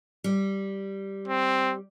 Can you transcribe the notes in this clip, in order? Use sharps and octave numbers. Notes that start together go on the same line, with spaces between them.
G3
C4